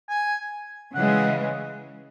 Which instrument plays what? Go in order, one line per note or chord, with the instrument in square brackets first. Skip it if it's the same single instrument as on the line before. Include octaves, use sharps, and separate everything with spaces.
[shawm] G#5
[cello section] C#3 E3 G#3 [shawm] F#5